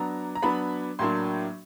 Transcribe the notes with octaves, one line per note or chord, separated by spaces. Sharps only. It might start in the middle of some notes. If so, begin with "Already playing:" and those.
Already playing: F#3 B3 D4 A#5
A#5
F#3 B3 D4 B5
A2 F#3 A#3 D4 C6